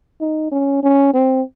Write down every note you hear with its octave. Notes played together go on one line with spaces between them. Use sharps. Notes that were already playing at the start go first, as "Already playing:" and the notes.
D#4
C#4
C#4
C4